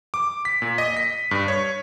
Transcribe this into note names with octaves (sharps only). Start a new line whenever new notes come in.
D6
B6
A#2
D#5
B6
G2
C#5